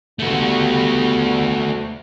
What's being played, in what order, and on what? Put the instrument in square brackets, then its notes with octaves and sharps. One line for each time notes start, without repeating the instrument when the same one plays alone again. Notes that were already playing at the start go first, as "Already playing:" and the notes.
[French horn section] G2 B3 [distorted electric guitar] A3 F#4